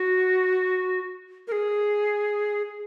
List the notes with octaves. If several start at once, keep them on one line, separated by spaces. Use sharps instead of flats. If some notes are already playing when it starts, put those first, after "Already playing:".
Already playing: F#4
A#4
G#4